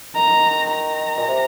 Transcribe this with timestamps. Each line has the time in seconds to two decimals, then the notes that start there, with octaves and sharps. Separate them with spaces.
0.15 D#3 A#5
0.71 A#5
1.18 A#2
1.28 C3